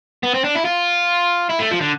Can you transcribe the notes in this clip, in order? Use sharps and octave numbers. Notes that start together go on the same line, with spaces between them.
B3
C4
D4
E4
F4
E4
A3
F3
D3